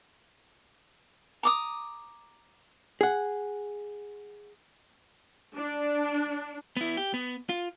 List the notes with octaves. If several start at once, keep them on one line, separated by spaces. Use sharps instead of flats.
A#5 D6 D#6
G#4 F#5
D4
B3 E4
G4
B3
F4